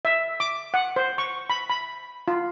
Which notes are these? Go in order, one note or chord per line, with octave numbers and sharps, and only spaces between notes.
E5
D6
F#5
C5
C#6
B5
B5
F4